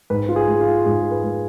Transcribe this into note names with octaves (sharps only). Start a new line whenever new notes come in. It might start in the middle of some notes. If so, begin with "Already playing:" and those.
G#2 B4
F4
G#4
G#3
F4
G#2 G#4
B4
G#3